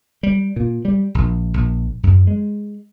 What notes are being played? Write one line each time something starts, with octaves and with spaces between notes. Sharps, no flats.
G3
A#2
G3
A#1
A#1
F#2
G#3